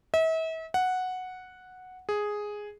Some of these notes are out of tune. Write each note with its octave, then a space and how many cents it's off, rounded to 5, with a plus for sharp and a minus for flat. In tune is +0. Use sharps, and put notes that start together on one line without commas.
E5 -40
F#5 -5
G#4 +0